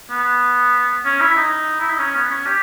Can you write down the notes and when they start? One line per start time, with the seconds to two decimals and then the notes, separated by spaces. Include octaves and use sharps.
0.10 B3
1.05 C#4
1.21 E4
1.36 D#4
1.80 E4
1.90 D#4
1.99 C#4
2.15 B3
2.30 C#4
2.46 G4